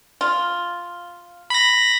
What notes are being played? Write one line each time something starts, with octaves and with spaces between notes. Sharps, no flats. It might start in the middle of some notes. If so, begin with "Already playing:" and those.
F4
B5 A#6